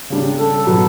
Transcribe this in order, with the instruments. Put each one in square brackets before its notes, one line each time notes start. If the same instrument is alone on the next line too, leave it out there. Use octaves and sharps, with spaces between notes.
[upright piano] C#3 G3 D4
[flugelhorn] A4
[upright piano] B2 F#3 B3